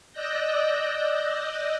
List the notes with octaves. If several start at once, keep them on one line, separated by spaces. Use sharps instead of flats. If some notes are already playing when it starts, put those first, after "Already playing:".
D5 D#5 E6 F#6 G6 A#6